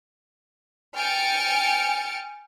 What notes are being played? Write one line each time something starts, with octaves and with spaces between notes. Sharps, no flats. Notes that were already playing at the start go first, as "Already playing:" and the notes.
G5 G#5 F6 A6 C#7 D7